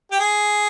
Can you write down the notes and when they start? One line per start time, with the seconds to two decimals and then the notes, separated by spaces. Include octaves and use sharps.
0.11 G4
0.20 G#4